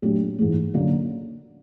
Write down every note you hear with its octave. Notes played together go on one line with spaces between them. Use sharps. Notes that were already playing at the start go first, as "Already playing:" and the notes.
A#2 F#3 A3 D4 G4
G#2 E3 G#3
D3 F#3 A#3 C#4